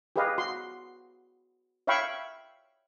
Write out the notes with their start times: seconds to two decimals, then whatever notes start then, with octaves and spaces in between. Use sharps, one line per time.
0.16 G4 G#4 B4 D#5 F5
0.38 F#4 C6
1.87 C#5 E5 F5 G5 B5 C#6